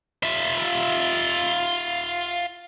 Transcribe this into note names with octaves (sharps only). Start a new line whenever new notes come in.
F4 E5